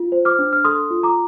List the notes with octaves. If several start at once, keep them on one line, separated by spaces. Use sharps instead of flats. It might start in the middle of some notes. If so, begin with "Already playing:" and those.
Already playing: F4
C5
D6 F6
D4
F6
A4 C6 D#6
F4
A#5 D6